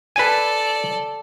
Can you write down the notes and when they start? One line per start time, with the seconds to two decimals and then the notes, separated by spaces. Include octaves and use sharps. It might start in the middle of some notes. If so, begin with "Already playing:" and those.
0.16 A4 B4 D5 G#5